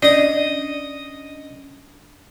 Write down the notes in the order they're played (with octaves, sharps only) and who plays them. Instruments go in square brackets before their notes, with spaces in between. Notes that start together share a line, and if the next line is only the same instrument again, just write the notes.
[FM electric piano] C#4 D4 [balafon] D5 [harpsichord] D#5 D#6